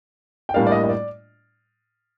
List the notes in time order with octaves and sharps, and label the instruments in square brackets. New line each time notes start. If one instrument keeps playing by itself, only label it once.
[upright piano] G5
A2 G3 A#3 D4 F5
D5
D#5
D#5
D5